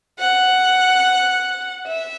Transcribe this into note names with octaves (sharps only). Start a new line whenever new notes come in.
F#5
E5